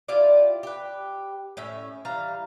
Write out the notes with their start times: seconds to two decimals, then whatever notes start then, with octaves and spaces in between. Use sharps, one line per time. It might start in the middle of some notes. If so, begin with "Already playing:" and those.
0.08 E4 F4 G4 D5
0.63 G4 B4
1.57 A2 C#4 E5
2.05 E3 G3 F5 A#5